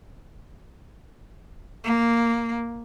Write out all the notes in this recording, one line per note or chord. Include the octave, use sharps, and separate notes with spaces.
A#3